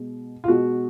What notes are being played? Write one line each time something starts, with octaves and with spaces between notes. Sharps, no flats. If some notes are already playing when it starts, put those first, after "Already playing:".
Already playing: B2 G#3
F4
B2 G#3 F#4